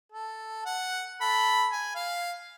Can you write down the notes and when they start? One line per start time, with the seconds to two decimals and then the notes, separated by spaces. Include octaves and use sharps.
0.12 A4
0.66 F#5
1.21 A4 B5
1.72 G#5
1.95 F5